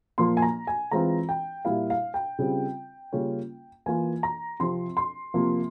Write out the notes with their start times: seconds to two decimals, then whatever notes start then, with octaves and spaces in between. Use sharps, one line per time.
0.18 A#2 F3 A#3 F4 C6
0.37 G#5
0.42 A#5
0.67 G#5
0.91 E3 G#3 C4 F4 A#5
1.29 G5
1.65 A#2 G3 A#3 E4 F5
1.90 F5
2.14 G5
2.39 C#3 G3 C4 F4
3.13 C#3 G3 A#3 C#4 F4
3.86 E3 A#3 F4 G#5
4.23 A#5
4.60 C3 F3 C4 F4 C6
4.97 C6
5.34 C3 F3 A#3 F4